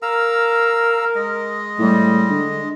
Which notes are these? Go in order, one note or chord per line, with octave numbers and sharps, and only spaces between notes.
A#4 F5 A#5 E6
G#3 D#5
A2 G3
D3